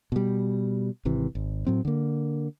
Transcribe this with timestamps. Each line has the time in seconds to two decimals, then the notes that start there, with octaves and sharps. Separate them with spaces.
0.12 B2 G3
1.05 G#1 C3 E3
1.35 G#1
1.67 A2 F#3 C4
1.85 D3 A#3